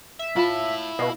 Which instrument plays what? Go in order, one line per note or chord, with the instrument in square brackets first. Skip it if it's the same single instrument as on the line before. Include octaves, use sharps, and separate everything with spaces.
[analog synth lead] E5
[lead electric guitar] E4 A5 [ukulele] F4 B5
[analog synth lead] B2 [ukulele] D#5 F5